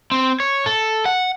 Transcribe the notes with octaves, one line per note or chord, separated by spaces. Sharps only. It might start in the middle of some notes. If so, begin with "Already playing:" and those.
C4
C#5
A4
F#5